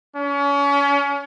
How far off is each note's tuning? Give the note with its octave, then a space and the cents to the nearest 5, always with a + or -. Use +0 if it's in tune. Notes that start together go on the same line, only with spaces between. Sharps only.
C#4 +35